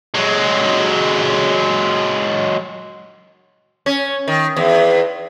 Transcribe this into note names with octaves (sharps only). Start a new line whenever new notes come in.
F#3 G#3
C#4
D#3
E2